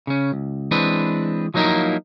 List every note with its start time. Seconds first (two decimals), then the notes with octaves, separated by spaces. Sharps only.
0.07 C#3 C#4
0.32 C#2
0.71 E3 G#3 C4 D4 B4
1.54 F3 F#3 A#3 D#4 E4 A#4